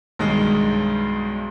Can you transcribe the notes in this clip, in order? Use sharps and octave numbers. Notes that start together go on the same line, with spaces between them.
B1 G2 D#3 G#3